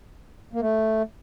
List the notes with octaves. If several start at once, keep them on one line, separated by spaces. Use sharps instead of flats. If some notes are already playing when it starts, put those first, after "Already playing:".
A#3
A3